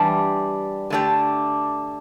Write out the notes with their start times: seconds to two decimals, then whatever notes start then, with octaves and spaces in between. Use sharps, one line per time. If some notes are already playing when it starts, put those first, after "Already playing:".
Already playing: E3 G3 D4 G4
0.90 D3 A3 D4 G4